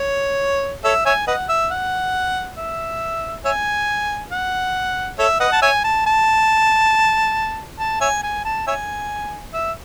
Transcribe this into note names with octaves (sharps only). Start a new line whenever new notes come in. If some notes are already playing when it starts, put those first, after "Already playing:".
Already playing: C#5
A4 C#5 E5
C#5 E5 G#5
B4 D#5 F#5
E5
F#5
E5
C#5 E5 G#5
F#5
A4 C#5 E5
B4 D#5 F#5
A5
C#5 E5 G#5
A5
A5
A5
C#5 E5 G#5
G#5
A5
C#5 E5 G#5
E5